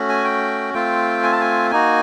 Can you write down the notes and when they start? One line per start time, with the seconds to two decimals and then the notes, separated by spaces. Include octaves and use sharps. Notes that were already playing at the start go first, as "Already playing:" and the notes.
Already playing: A3 C#4 F#4
0.09 G#5
0.24 G5
0.74 A3 C4 F4 G5
1.23 G#5
1.32 A5
1.40 G#5
1.71 A#3 D#4 F#4 G#5